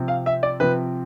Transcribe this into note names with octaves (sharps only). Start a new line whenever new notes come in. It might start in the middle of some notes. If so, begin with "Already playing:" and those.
Already playing: C3 F3 C4
F5
E5
D5
C3 F3 C4 B4